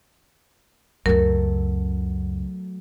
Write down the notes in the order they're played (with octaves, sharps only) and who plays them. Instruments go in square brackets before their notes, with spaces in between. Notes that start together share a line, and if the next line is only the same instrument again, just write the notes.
[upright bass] C#2 C#3 [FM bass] F#2 [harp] F#3 A3 A4 [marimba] A#4